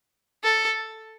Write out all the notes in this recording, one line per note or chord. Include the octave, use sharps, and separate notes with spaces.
A4